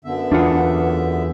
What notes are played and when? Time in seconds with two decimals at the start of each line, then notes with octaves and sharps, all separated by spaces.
0.05 F#2 D3 B3 E5
0.32 E2 D4 F4 F#5